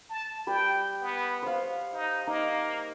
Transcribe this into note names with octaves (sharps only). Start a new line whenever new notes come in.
A5
G3 B4 G5
B3
C5 C#5 F5
D#4
A#3 D#4